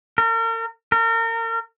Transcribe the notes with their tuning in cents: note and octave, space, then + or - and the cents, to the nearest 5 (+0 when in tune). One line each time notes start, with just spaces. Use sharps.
A#4 -40
A#4 -35